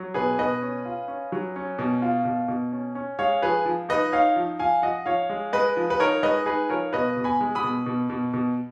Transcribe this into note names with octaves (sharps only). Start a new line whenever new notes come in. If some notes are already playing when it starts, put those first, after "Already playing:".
Already playing: F#3
B2 G#4 B4
B2 B4 D#5
C#4
F4
C#4
F#3
C#4
B2
F4
B2
B2
C#4
C#4
G#3 C#5 F5
F3 G#4 B4
F3
D#4 B4 D#5
D#4 C#5 F5
F3
F3 F5 G#5
F3 D#5 F#5
F3 C#5 F5
G#3
G#3 B4 D#5
F3
B4
D#4 A#4 C#5
G#3 B4 D#5
D#4 G#4 B4
F3 A#4 C#5
B2 B4 D#5
B2
G#5 B5
G#3
B5 D#6
B2
B2
B2
B2